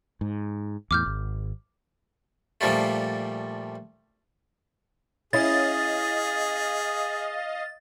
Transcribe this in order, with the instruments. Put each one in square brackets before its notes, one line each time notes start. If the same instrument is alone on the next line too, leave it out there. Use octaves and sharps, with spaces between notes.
[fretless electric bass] G#2
[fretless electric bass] E2 A2 [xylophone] D6 F6 G6
[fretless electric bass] G#1
[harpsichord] A#2 F3 G3 A3
[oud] C#4 E4 [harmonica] G#4 [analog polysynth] D#5 F5 [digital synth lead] A6